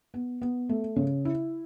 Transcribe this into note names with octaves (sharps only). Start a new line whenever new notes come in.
B3
B3
A3
C#3
E4